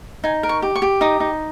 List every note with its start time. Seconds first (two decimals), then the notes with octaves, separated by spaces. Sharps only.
0.24 D#4 G#5
0.43 A#4
0.49 C#6
0.62 G4
0.75 C#6
0.82 G4
1.01 D#4 D#6
1.20 D#4